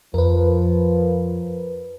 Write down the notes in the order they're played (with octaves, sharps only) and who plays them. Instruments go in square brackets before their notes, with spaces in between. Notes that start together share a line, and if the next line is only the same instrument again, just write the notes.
[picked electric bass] F2 [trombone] F3 [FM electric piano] A#4 B4